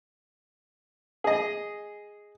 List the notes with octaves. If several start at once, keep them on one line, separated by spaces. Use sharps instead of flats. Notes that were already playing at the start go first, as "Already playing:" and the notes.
G#4 D#5